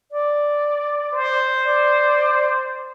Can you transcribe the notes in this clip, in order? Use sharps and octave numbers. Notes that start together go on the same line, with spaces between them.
D5
C5
D5